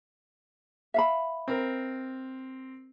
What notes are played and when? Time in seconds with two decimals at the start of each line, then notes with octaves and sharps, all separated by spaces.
0.94 E5 F5 B5
1.48 C4 A#4